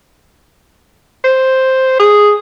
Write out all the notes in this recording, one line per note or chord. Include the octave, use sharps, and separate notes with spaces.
C5
G#4